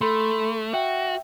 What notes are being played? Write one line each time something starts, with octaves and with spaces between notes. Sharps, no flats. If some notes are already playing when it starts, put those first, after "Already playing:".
A3 A4 B5 C6
F#4 E5 G5